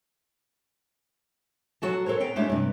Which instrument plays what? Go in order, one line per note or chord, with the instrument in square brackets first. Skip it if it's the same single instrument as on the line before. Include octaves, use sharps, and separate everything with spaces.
[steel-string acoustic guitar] F#3 F#4 A4 A5
A4 A#4 C5 C#5
B3 F5 G5 A#5
G#3 A3 C#4 D4 E4 G4
G2 C3